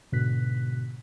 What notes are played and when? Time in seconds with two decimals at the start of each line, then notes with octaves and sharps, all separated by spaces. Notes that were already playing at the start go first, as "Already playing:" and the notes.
0.12 G#2 B2 D3 F#6 B6